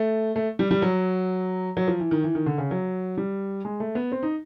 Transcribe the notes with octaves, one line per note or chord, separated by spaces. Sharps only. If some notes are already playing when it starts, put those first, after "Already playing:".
Already playing: A3
A3
G3
G3
F#3
F#3
F3
E3
D#3
E3
D#3
D3
C#3
F#3
G3
G#3
A3
B3
C4
D#4